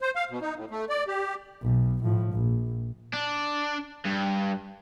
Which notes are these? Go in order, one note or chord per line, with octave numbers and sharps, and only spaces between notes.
C5
F5
B2
D#4
A2
A3
D5
G4
B1
A2 F3
A#1
D4
G2